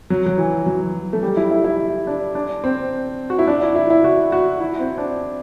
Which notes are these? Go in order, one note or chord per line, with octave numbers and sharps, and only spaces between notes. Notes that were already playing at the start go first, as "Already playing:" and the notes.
F#3
F#3
E3
F#3
A3
G3
E4
E4
E4
D4
D4
C4
F#4
E4
D4
E4
E4
E4
F#4
F#4
E4
C4
D4